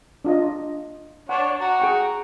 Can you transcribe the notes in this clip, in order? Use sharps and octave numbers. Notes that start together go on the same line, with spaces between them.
D4 F4 D#5
D4 C#5 F#5
F#4 A#5
G#4 G5 C#6